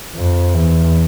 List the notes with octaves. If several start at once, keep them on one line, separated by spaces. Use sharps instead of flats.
F2
E2